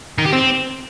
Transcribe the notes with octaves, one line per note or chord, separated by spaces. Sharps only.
D#3
G4
C4